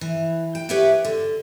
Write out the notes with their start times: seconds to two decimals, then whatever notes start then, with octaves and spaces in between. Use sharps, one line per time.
0.01 E3
0.55 G5
0.69 G4 B4 C#5 E5 F#5 G5
1.05 D3